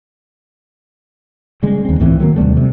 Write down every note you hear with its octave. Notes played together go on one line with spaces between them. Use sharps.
C#3 G3 G#3
D#2 C4
C#2 A2 E3 C4
D#3 F#3 G#3 A#3
D#2 C3 G3 A3
C3